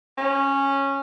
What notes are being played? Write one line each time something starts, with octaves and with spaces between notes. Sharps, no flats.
C#4